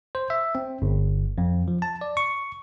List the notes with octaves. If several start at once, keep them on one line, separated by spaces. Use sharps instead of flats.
C5
E5
C4
G1
F2
F3
A5
D5
C#6